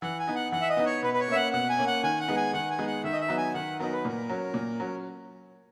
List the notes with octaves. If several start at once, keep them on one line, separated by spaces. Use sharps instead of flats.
E3 F#5
G#5
B3 D#4
F#5
E3 F#5
E5
D#5
B3 D#4
C#5
B2 B4
B4
C#5
A#3 C#4 E5
F#5
B2 F#5
G#5
A#3 C#4
F#5
D#3 G#5
F#5
G#3 B3 D#4
G#5
D#3 F#5
G#5
G#3 B3 D#4
F#5
D#3 E5
D#5
E5
F#3 B3 D#4
G#5
D#3 F#5
F#3 B3 D#4 A#4
B4
A#2 A#4
F#3 C#4
A#2
F#3 C#4